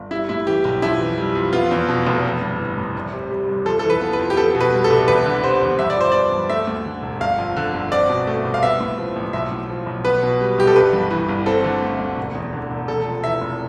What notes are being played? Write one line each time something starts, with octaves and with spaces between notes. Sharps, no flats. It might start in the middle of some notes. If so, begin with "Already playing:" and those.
Already playing: G1
G3 E4
A2 E4
E3 G4
B1 G4
F2 E4
E3
G3
F2
B3 F4
E2
B2
F1
B3
G2
E3
A1
C2
C3
G3
C2
F2 A4
E3 A4
B4
B3
B4
F2
G4
B3 A4
B2
B4
G3
A4
C2
E2 B4
D3
G3 C5
E2
G2 E5
D5
F3 C5
B3 D5
G2
A3 E5
D2
D3
E1
G1 F5
F2
D3
G1
C4 D5
B2
A3
C2
F5
B3 E5
A2
F3
A1
B1 E5
A2
F3
B1
B3 B4
B2
G3
C2 G4
A4
G1 B4
G2
E3
G1
C4 A4
D3
A3
D2
E1
E2
D3
E1
F1 A4
F2
E3 E5
F1